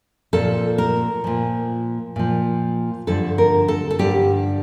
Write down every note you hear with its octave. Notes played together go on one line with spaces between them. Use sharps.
A#2 F3 A4
A#4
A#2 F3
A#2 F3
G2 D3 F3 A4
A#4
A4
A4
G2 D3 F3 G4